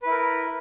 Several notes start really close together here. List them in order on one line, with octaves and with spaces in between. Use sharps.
B4 E4 A#4